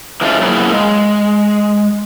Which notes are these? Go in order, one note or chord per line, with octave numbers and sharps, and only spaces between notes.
E3 G#3 A3 C4 C#4 F4
F#3 A#3 B3 E4 G#4
G#3